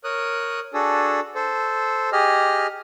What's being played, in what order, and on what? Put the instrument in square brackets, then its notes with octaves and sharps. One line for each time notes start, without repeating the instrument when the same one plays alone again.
[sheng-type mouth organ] A#4 C#5 D#6 F#6
D4 F#4 G#4 A4
A4 C5
G4 G#4 D#5 F6